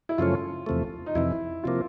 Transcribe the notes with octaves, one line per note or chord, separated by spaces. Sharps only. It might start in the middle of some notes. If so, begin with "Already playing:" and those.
E4
F#2 C#3 F3 A3 C#4 F4
E2 C3 F3 A3
D#4
F2 C3 E3 E4
C3 F3 A#3 F4